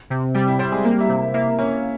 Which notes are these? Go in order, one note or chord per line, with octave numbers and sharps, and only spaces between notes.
C3
G3 G4 G5
E4 E5
G3 C4 C5
G#3 G#4
A#3 G4
E4 E5
C3
A#3 E4 E5
A#3 C#4 C#5